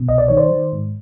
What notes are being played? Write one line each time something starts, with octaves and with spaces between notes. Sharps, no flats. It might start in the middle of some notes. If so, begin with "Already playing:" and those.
Already playing: B2
C2 D#5
D5
D#3 C#5
C5 D5
D#3
G#2